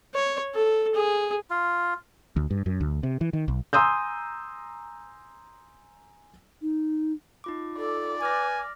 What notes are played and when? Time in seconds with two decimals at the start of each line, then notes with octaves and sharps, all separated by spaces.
0.14 C#5
0.55 A4
0.95 G#4
1.50 F4
2.36 D2
2.51 G2
2.66 F#2
2.80 D2
3.03 C3
3.21 E3
3.33 D#3
3.48 B1
3.73 G#5 A#5 C6 D#6 E6 G6
6.61 D#4
7.44 D#4 F4 D6
7.77 A4 D5
8.21 B4 G#5 D6 F6 A#6